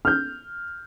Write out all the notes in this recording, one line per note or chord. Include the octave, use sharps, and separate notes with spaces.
F6 G6